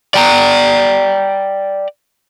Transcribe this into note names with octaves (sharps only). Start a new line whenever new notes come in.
D5 G5 G#5 A#5